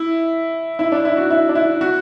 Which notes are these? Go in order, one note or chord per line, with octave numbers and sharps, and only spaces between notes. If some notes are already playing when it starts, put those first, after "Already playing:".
Already playing: E4
E4
D4
E4
F#4
E4
D4
E4
F#4